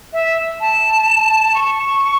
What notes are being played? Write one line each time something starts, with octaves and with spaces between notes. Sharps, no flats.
E5
A5
C#6